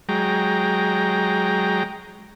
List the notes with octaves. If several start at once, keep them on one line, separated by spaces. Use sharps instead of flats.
F#3 G#3 G5 A#5